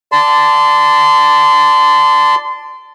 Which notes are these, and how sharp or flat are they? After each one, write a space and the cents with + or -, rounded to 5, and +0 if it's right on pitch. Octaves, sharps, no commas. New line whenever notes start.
D5 +0 A5 +0 C6 -25